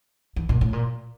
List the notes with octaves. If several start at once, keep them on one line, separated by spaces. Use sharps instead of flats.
E3
A#2
A2
A#2